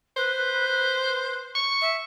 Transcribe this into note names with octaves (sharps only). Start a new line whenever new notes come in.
B4 C5
C#6
E5